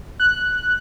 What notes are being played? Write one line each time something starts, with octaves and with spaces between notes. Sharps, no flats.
F#6